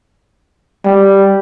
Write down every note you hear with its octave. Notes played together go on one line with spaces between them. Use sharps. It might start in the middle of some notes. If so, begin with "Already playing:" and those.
G3